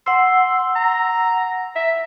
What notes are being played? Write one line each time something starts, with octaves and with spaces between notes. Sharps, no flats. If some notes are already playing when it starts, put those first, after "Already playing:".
F#5 C6 E6
A#5
E5